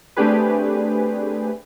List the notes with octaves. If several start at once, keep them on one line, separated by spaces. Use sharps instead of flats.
A3 C4 D4 G4 G#4 B4